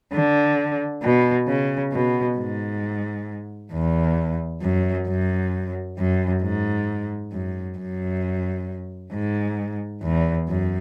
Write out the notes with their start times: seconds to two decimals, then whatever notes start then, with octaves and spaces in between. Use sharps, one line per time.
0.13 D3
1.02 B2
1.47 C#3
1.92 B2
2.38 G#2
3.72 E2
4.62 F#2
5.07 F#2
5.98 F#2
6.42 G#2
7.32 F#2
7.78 F#2
9.12 G#2
10.02 E2
10.48 F#2